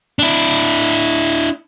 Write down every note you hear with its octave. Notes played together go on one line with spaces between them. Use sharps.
D4 E4